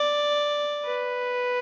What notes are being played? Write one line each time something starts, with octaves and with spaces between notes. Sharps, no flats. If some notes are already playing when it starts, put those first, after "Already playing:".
Already playing: D5
B4